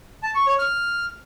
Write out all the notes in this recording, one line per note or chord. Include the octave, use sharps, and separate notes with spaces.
A5
C#6
C#5
F6